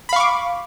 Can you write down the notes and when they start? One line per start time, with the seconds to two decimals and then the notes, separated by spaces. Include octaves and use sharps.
0.09 B5
0.13 F5
0.16 C#6
0.20 D6